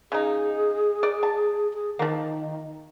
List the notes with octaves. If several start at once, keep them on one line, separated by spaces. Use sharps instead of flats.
C#3 D#4 G#4
D5
A5
G#4
D#3 F3 A#3